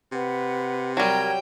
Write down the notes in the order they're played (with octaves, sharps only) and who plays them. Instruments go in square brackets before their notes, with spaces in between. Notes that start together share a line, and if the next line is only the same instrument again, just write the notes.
[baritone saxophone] C3 [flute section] B4 F#5
[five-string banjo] F#3 G3 [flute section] A#4 A#5 G#6 [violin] G5